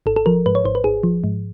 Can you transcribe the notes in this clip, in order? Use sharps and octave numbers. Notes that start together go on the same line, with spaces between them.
G#1 A4
A4
F3 A#4
G#2 B4
C#5
G#1 C5
B4
G#1 G#4
F3
G#2